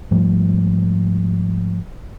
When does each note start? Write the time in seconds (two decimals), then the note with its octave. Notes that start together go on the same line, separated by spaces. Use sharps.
0.11 G#2 F3 G3 A3